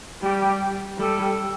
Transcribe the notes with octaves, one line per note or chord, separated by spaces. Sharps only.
G3 G4
G3 A4